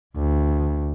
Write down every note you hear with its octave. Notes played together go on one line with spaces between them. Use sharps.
D2